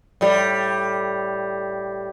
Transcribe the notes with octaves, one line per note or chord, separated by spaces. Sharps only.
A2 G3